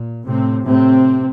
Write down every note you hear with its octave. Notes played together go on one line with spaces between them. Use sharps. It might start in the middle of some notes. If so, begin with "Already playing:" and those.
Already playing: A#2
A2 C3 C4
A2 C3 C4